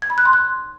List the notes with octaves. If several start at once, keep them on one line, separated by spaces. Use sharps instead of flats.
G#6
B5
F#6
C6
F#6